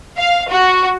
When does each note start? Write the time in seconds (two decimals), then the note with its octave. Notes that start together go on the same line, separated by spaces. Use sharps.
0.18 F5
0.50 F#4